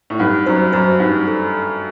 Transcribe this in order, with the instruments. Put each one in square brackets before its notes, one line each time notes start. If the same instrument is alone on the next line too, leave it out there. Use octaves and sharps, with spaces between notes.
[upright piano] A2
[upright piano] G2 [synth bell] D#4
[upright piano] F#2 [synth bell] C5
[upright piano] F#2 [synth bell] C5
[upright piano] G2 [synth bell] D#4
[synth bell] A4